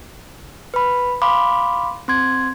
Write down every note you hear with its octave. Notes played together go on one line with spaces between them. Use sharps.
B4 B5
F5 B5 C6 D6
C4 C6 G#6